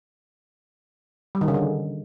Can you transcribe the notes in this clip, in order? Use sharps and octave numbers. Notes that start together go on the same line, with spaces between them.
G3
D#3
C#3
D3